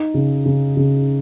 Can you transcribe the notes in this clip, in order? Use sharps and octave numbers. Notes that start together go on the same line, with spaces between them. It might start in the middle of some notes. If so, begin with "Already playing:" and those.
Already playing: D#4
C#3
C#3
C#3